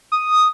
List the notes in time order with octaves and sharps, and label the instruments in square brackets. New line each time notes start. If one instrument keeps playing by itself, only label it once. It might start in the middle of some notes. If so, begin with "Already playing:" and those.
[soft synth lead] D#6